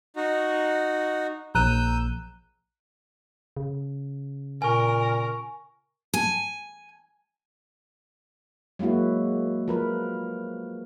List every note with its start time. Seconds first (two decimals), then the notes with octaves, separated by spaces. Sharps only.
0.16 D#4 F#4
1.55 A#1 A#5 E6 F#6 G6 D#7
3.57 C#3
4.62 A#2 A#4 G#5 C#6
6.14 G#5
8.79 F#3 G#3 A#3 E4 F#4
9.68 F3 A#4 B4